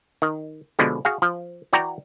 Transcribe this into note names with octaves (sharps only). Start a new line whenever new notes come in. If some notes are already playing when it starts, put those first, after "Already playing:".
D#3
B2 D3 F3 G#3
F#4 G#4 F5
F3
E3 F#4 D5 G5 A#5